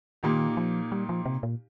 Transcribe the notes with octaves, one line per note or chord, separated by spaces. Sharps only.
A#2 D#3 A#3 D#4 G4
F3
G3
F3
C3
A#2